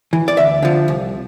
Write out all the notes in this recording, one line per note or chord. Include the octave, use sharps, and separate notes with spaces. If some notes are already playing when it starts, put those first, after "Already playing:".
E3
D5
D2 E5
D3 F3
C2